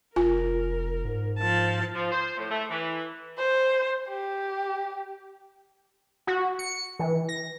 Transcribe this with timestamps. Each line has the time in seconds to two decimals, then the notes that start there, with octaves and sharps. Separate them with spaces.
0.16 F1 F4 A#4 G#5
1.05 G#2
1.38 F3 A5
1.95 F3
2.12 C5
2.38 A2
2.50 A3
2.70 E3
3.38 C5
4.08 G4
6.27 F#4
6.59 C#7
6.99 E3
7.29 A#6